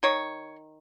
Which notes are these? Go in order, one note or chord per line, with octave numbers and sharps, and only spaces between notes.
D#3 C#5